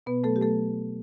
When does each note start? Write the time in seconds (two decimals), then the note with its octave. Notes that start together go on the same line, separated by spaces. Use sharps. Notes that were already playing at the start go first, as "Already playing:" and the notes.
0.06 B2 B3 B4
0.24 F#3 A3 A4
0.36 G4
0.42 F#3 A3 A4